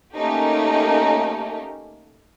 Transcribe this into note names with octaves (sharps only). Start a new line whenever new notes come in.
A3 A#3 C#4 D#4 G4